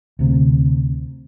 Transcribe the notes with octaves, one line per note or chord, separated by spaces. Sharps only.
D2 C3